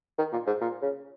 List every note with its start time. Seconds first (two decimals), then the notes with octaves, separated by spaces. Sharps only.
0.18 D#3
0.33 A#2
0.47 G#2
0.61 A#2
0.82 C#3